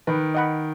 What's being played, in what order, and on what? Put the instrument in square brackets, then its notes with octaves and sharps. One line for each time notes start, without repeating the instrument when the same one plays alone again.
[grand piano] D#3 [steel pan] B4
[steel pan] D#5 F#5 B5